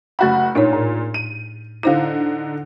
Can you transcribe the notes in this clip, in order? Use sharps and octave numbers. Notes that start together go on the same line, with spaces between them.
F#1 A3 F#4 F#5 B5
A#2 D4 D#4 C#5
A2
D#7
D3 D#4 E4 C5 F5